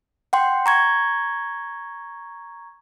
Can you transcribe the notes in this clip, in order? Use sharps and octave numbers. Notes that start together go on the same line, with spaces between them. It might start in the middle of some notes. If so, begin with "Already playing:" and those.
F#5 G5 C6
A#5 C#6 G#6